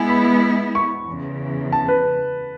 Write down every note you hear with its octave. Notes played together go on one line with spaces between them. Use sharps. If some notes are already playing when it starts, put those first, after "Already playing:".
Already playing: G#3 B3 E4 G#5
B5
C#6
E2 C#3 E3
A5
B4